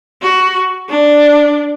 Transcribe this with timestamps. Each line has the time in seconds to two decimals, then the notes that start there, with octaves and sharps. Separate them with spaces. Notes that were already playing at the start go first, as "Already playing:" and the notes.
0.22 F#4
0.89 D4